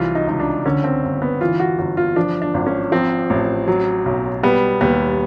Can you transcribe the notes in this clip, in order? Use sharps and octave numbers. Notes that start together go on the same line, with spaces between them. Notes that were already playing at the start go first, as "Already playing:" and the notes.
Already playing: C2 E3 F#3 F4
D#4
C#2 D#4
D4
D3 C#4
C4
G1
B3
E3 F4
F#4
G1 F#4
F4
F3 D4
D4
G#1
C#4
F3 C4
A1
F#3
B1
G3 B3
D#2 B3